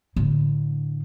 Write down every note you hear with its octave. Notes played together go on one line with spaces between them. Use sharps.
A2 D3